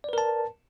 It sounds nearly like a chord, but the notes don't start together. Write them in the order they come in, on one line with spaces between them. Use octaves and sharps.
D5 B4 A#4 A5